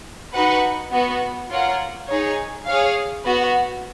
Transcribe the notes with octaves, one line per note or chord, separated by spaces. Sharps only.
D#4 F#4 B4 F#5
B3 F#4 B4
F4 A#4 C#5 F#5
D#4 G#4 C#5
G#4 C#5 F5
B3 F#4 B4